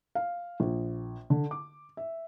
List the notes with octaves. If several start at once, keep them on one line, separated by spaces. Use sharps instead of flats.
F5
A#1
D3
D6
E5